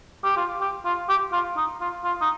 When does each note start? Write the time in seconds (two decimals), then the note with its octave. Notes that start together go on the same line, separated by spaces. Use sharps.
0.24 G4
0.37 F4
0.61 G4
0.85 F4
1.09 G4
1.32 F4
1.57 D#4
1.81 F4
2.04 F4
2.21 D#4